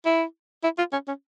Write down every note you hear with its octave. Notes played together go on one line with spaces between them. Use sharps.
E4
E4
F4
C#4
C#4